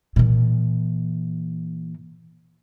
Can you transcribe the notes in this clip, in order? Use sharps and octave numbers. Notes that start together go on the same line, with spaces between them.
A#2 E3